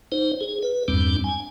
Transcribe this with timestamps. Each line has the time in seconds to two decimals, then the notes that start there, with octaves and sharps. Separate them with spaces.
0.12 D#4 C5
0.41 G#4
0.63 B4
0.88 E2 G2 G3 C4 D4
1.24 G#5